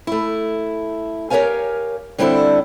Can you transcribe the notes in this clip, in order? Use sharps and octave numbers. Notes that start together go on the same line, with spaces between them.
A3 E4
G4 A#4 C5 C#5 F5 G#5
D3 G3 C4 D4 E4 A4